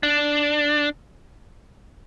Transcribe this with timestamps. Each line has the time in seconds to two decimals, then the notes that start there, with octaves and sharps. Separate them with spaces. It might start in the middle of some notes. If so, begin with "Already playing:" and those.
0.03 D4